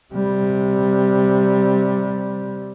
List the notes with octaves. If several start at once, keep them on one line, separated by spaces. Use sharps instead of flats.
C3 G3